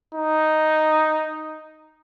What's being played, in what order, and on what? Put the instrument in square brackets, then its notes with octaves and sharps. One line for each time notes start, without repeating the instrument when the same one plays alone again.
[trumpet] D#4